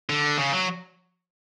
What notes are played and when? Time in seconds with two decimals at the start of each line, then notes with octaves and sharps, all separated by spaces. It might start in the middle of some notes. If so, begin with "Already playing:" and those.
0.09 D3
0.38 C#3
0.53 F#3